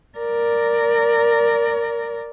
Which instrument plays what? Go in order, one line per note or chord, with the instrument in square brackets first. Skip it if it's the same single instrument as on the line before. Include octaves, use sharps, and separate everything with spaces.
[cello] A#4 D5